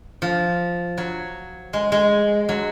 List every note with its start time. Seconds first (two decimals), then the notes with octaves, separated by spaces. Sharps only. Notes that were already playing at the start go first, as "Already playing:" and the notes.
0.22 F3
0.98 F#3
1.73 G#3
1.92 G#3
2.49 F#3